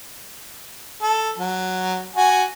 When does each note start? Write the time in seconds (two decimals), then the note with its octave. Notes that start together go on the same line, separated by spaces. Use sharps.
1.02 A4
1.38 F#3
2.16 F#4 G#5